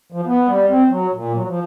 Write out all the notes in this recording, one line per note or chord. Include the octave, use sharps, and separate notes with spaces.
F3
B3
G3
C4
F#3
A#2
F#3
F3